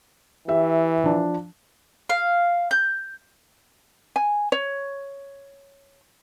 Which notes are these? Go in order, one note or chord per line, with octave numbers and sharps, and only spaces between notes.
E3 G4 E5
F3 D4
F5
G6
G#5
C#5